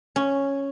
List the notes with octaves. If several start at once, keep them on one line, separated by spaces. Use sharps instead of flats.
C#4